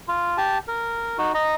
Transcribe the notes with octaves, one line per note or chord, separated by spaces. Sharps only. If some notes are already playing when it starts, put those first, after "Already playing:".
F4
G4 A5
A#4
D#4 F#4
D#5 A#5